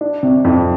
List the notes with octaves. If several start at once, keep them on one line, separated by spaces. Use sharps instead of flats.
D4
C3
F2